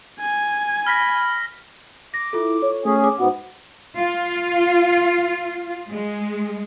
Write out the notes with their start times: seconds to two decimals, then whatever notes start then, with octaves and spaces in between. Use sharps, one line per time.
0.20 G#5
0.87 B5 F6 A#6 B6
2.14 D6 A#6
2.33 E4 F4 A4
2.62 C#5
2.85 A3 C#4 G#4
3.04 D6
3.19 G#2 B3 F#4
3.97 F4
5.89 G#3